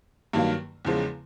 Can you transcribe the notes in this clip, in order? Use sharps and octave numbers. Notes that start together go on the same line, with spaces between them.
G2 D#3 F#3 A#3
E2 C#3 F3 G#3